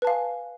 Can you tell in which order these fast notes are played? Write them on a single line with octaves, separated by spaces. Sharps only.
B4 A5 F5 G#5